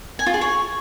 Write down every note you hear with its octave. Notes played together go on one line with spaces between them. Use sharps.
G#5
F4
G#4
C#5